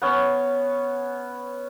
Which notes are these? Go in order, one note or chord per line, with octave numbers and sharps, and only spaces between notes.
B3 C#4